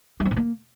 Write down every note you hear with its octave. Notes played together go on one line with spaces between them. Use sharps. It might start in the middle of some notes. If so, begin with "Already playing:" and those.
G3
C4
A#2
A#3